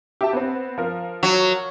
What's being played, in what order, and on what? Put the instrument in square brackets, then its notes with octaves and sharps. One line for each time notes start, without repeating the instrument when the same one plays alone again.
[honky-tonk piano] G4 E5 A5
B3 C4
F3 A#4
[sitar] F#3